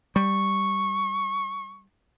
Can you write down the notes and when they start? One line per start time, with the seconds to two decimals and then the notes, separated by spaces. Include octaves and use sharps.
0.16 G3 C#6